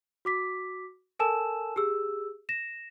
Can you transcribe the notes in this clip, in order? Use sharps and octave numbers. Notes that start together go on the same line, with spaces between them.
F#4 D6 B6
A4 A#4 G#5 A5 E6 E7
G4 G#4 E6
A#6 E7